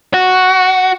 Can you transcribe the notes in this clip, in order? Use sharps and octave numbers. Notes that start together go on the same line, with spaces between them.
F#4